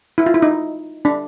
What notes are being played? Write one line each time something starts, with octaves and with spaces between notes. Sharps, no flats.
E4
F4
E4
D#4
D4